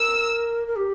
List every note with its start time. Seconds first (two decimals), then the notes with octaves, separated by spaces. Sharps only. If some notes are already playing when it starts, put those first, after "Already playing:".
Already playing: A#4 E6
0.67 A#4
0.77 G4